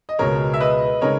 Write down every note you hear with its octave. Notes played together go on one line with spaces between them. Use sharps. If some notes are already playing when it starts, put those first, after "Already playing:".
D#5
C#2 B2 G#3 A#4 C#5
E5
B4 D#5
C#3 G#3 D#4 A#4 C#5